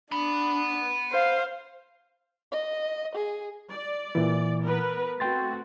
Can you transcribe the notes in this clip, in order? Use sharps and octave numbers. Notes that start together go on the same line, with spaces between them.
D4 F#5 B5
C5 F5
D#5
G#4
D5
A#2 E3
B3 A#4 B4
A3 C4 F#4 G5 C6 A6